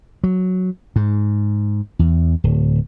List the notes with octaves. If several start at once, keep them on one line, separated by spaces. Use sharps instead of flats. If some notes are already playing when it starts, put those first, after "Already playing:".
F#3
G#2
E2
D1